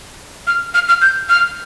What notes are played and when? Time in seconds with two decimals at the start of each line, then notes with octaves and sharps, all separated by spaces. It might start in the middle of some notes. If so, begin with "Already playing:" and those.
0.47 F6
0.74 F6
0.88 F6
1.02 G6
1.29 F6